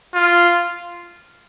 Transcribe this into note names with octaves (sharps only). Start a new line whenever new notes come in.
F4